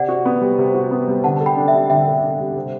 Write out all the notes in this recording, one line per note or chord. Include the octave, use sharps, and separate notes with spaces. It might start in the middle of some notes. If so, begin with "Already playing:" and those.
Already playing: C3 D5 F#5
F#4
B3
G3
C3
F#4
B3
G3
D3 F#5 A5
A4 A5
G5 B5
D4
E5 G5
G3
D3 E5 G5
A4
D4
G3
C3